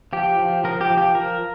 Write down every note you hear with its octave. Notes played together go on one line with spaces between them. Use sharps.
F3 G4
F3
F3 A#4
G4
F3
G4
F3 A#4